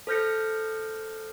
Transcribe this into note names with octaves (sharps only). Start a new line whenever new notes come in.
A4 C5 F6 G6 A#6 C#7